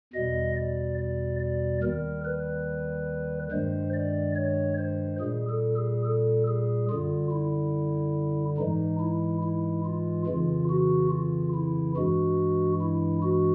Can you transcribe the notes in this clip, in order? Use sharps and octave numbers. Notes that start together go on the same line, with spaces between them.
E2 B2 G3 D#5
D5
D5
D5
D#2 D#3 G3 A#4
B4
G2 D#3 G#3 C5
D5
C#5
C5
A#2 G3 G#4
A4
G#4
A4
G#4
F#2 D3 G3 F4
E4
G#2 E3 G#3 D#4
E4
E4
F4
F2 C#3 E3 F4
F#4
F4
E4
G2 E3 G#3 F#4
E4
F#4